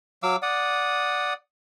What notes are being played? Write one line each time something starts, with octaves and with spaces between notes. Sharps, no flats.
F#3 F5 D6 E6
D5 F#5 D#6